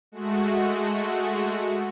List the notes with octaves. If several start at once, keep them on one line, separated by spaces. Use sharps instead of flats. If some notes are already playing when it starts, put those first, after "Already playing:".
G#3 A3 F#4